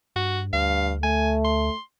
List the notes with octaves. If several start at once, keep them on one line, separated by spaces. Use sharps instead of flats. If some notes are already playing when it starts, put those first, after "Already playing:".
G2 F#4
D2 G2 F5
A3 G#5
C6